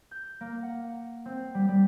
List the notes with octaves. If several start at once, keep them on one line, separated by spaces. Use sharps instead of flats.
G6
A#3
F#5
C4
G3
G3